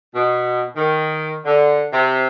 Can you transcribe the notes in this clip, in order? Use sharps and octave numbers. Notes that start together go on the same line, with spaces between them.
B2
D#3
D3
C3